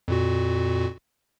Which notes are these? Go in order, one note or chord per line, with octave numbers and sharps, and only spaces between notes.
F2 A#2 F#4